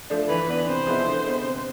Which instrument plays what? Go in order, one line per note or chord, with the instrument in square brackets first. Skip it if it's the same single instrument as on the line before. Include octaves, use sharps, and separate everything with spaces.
[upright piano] F3 A3 D4
[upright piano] E3 [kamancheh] B4
[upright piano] B3 D4
[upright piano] C3 [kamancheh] C5
[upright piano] F3 G#3 B3 E4
D3
G#3 B3
C3